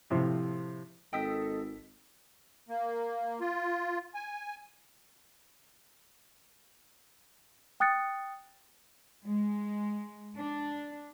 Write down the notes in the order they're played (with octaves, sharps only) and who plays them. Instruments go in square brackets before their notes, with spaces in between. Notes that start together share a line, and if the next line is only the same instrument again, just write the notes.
[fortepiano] A2 C3 F3
[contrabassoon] G#1 [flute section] A4 [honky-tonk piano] D#5 E6 B6 [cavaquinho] G5 D#6
[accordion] A#3
F4
G#5
[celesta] G5 D#6 F#6 A6 C#7
[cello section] G#3
D4